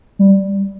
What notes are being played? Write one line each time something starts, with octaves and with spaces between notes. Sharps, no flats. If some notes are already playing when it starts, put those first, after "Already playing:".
G3